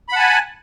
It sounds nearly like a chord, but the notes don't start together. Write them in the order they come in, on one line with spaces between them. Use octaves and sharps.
B5 F#5 A5 G#5